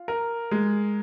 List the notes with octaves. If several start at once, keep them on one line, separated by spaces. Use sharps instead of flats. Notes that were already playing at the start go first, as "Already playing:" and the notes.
Already playing: F4
A#4
G#3